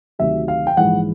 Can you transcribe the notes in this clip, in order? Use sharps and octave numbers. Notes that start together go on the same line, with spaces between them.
D2 C3 D#3 F#3 E5
F5
G5
A#1 G#2 E3 F#5